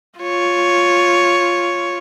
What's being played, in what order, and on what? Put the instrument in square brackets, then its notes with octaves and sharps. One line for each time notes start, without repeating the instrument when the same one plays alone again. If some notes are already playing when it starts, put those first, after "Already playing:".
[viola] F4 C#5